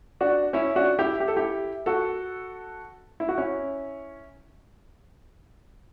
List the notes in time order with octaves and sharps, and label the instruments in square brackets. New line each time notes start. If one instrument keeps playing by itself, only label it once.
[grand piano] D4 F#4
C#4 E4
D4 F#4
E4 G4
G4
A4
E4 G4
F#4 A4
E4
F#4
C#4 E4